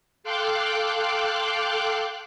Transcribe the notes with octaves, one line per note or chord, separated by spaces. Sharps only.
A4 F5 G5 C6 D6 F#6